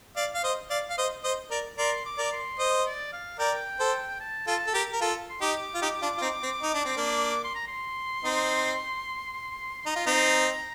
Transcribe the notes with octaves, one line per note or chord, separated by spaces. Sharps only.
D5 F5
F5
C5 D#5
D5 F5
F5
C5 D#5
C5 D#5
A#4 D5
A#4 D5 C6
D6
A#4 D5
D6
C6
C5 D#5
D5
F5
A#4 D5 G5
A4 C5
A5
F4 A4 A5
A4
G4 A#4
A#4
F4 A4
C6
D#4 G4 D6
F4
D#4 G4
D4 F4
F4
C4 D#4
C4
D#4
D4
C4
A#3 D4
C6
A#5
C6
C4 D#4
C6
D#4 A#5
F4
C4 D#4